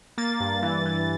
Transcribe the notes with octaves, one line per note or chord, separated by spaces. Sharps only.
A#3 A6
G2
E3
E3